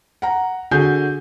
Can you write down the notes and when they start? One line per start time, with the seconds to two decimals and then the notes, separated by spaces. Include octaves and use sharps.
0.22 F#5 A#5
0.71 D3 F#4 G#4 G#5 G6